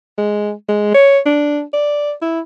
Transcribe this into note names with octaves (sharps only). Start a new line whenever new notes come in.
G#3
G#3
C#5
D4
D5
E4